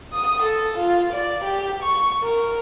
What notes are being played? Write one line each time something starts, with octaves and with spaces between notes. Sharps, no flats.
D#6
A4
F4
D5
G4
C#6
A#4